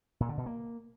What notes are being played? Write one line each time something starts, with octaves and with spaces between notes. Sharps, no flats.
A#2
D3
B2
A#3